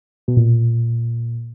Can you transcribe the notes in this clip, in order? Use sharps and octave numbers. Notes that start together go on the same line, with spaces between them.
B2
A#2